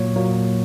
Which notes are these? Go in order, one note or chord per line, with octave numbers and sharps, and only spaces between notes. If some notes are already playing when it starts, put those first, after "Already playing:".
Already playing: A#2 F#3 A#3 C#5
A#2 F#3 A#3